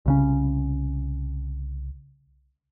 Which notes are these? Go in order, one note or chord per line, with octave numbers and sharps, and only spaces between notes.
C2 C#3 C#4